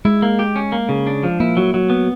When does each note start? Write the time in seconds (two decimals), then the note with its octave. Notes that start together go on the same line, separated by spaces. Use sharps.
0.05 G#3 E4
0.22 A#3
0.39 G4
0.56 C#4
0.72 A#3
0.89 C#3
1.07 D4
1.23 F3
1.40 A#3 E4
1.57 F#3
1.74 F#3
1.90 B3